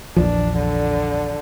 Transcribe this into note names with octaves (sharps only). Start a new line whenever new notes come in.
A#1 E2 F3 D4
D3